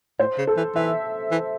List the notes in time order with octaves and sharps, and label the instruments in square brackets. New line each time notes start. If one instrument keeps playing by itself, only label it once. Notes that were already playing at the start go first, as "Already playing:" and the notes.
[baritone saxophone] A2 [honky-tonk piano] C5
[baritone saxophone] C#3
[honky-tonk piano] A4
[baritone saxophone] E3
[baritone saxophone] E3 [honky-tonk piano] E5
[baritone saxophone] E3